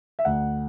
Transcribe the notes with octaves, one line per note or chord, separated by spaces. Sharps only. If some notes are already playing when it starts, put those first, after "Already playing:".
E5
D2 F#5